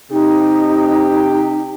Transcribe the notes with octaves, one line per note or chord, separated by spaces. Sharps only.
C3 D#4 G4